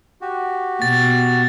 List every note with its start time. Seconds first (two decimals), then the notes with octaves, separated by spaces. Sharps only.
0.21 F#4 G4
0.82 B2 A6